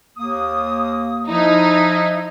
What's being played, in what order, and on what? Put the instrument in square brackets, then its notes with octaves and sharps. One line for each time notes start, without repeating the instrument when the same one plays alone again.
[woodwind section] D#2 A#3 D#6
[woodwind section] F3 E4 [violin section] D#4